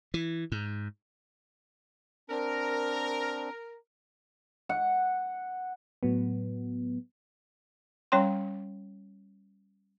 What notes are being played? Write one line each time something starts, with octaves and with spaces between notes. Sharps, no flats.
E3
G#2
C4 D4 A#4
F#5
A2 F#3 B3
G3 C#4 C#5 G5 C6